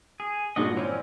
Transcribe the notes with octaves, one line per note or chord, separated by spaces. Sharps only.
G#4
G2 A#2 G#3 D4 F#4 D#5
E3 C4 C#4 C#5 D5